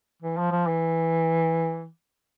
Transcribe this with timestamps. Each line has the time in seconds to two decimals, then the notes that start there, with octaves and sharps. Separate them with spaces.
0.22 E3
0.38 F3
0.52 F3
0.67 E3